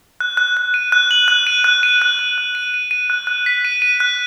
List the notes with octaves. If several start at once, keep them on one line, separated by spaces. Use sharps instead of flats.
F#6
F#6
F#6
D#7
F#6
F#7
F#6
D#7
F#6
D#7
F#6
F#6
F#6
D#7
D#7
D#7
F#6
F#6
B6
D#7
D#7
F#6